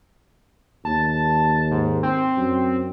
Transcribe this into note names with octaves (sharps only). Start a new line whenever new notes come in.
D#2 A5
G#2
C4
F#2